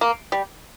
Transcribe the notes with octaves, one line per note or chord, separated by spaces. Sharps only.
A#3
G3